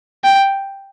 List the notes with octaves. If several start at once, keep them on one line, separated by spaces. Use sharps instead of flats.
G5